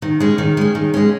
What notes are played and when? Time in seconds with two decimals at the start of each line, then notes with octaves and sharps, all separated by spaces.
0.02 D#3
0.20 G#3 C#4
0.38 D#3
0.57 G#3 C#4
0.75 D#3
0.94 G#3 C#4